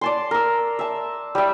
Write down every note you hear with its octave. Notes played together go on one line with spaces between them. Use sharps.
D5 A5 C6
A#4 E6
E5 A5
G3 E5